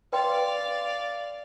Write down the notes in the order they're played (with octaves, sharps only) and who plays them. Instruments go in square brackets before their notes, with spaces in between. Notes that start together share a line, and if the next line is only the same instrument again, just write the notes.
[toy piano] B4 G5 C6 [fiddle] D5 F5